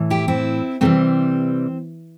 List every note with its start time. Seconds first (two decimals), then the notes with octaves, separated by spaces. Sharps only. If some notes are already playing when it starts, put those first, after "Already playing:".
Already playing: A2 E3
0.10 E4 G4
0.28 C4 E4
0.81 C3 E3 G3 A3 C4